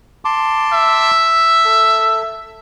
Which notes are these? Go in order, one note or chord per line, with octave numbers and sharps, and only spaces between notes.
A5 C6 D6
E5
A4